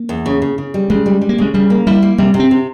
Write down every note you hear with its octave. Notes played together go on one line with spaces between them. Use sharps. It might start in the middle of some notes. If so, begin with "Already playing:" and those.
Already playing: A#3
E2
C#3
C#3
C#3
G3
C#3 G#3
G3
G3
A#3
C#3 G#3
C#3 G3
A#3
G3 E4
A#3
C3 G3
C3
C4
C3